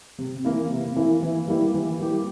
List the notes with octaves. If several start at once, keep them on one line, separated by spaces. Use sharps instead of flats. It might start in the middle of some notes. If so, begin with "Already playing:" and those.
C3
E3 A#3 E4
C3
E3 A#3 E4
E3
G3 A#3 E4 G4
E3
G3 A#3 E4 G4